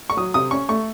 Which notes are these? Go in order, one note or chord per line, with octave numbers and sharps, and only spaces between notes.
C#6
F#3 D#6
C3 D#6
C#4 C#6
A3 C#6